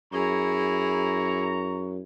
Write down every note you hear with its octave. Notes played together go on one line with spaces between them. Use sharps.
F#2 E4 G#4 A#5 C#6